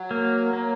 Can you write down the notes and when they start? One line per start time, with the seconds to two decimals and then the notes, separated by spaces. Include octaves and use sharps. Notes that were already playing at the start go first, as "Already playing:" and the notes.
Already playing: F#3
0.11 A#3
0.53 A#3